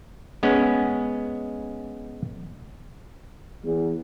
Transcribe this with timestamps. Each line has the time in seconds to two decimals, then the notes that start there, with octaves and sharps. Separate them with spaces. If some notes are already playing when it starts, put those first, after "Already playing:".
0.43 G#3 B3 C#4
3.64 E2